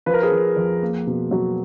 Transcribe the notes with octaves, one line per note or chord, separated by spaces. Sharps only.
F3 B4
A#4
G#4 B4
F3
F2
A#3
B2
F#3